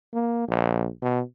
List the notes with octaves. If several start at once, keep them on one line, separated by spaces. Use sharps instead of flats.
A#3
A#1
B2